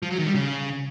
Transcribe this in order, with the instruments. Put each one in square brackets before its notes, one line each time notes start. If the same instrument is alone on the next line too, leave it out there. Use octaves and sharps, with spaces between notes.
[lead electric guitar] F3
F#3
D#3
G3
C#3